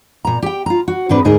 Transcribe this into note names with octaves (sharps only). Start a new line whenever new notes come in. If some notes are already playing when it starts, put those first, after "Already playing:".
A#2 A#5
G4 G5
F4 A#5
F#4
G#2 C4 D4 B4
D2 G#2 D#4 G#4 A#4